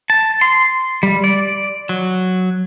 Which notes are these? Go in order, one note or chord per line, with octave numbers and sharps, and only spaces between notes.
A5
C6
G3
D5
F#3